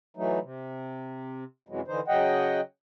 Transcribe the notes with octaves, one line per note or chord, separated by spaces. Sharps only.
E3 F#3 A3 D#4
C3
F#2 C3 E3 F#3 G#3
D3 E3 D#4 C5
C#3 F#3 D#5 F#5 G5